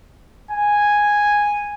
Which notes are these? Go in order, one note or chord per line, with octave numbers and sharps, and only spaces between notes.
G#5